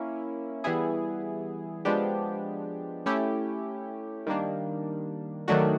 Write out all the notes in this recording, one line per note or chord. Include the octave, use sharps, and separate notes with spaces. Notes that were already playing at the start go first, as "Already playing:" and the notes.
Already playing: A#3 C#4 E4
E3 G3 B3 E4 G#4
F3 G#3 B3 D4 G4
A3 C#4 E4 G4
D#3 G3 A#3 D4
D#3 F#3 A3 D4 F#4